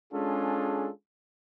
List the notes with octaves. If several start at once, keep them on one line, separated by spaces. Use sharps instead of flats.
G#3 C#4 D4 F4 G#4 A4